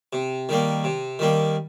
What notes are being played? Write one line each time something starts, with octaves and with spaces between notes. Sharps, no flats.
C3
D#3 G3 A#3
C3
D#3 G3 A#3